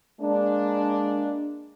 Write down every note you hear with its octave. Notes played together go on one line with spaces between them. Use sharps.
G#3 A#3 D4